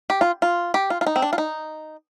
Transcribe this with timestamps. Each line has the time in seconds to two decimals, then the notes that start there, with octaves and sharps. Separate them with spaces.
0.10 G4
0.21 F4
0.42 F4
0.74 G4
0.90 F4
1.01 F4
1.06 D#4
1.16 C4
1.22 D4
1.33 F4
1.38 D#4